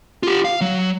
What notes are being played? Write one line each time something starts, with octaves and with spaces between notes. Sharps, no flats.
F4 G4
F5
F#3